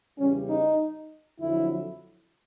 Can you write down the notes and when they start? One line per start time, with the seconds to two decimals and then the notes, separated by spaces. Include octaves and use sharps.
0.17 E2 C#3 E3 G3 C#4
0.48 D#4
1.39 F2 D3 F#3 E4